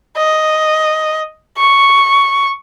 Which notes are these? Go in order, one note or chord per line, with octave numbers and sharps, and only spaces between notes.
D#5
C#6